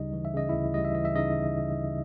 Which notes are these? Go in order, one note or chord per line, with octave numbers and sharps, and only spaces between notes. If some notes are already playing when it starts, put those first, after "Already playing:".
Already playing: D2 C#3 G3 D#4 D#5
E3
E5
C#3 D#5
D2 E4 E5
G3 D#5
E5
E3 D#5
E5
C#3 D#4 D#5